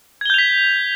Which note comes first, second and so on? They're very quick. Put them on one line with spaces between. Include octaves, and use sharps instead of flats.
G#6 G7 G6 F7 B6